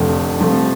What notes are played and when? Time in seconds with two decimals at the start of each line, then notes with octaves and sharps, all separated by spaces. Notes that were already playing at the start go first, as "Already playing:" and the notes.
Already playing: F1 F2 D3 F3 A3
0.39 C3 F3 A3